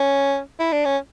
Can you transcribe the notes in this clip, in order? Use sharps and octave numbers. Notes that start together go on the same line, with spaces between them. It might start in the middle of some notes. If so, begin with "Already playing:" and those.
Already playing: C#4
E4
D4
C#4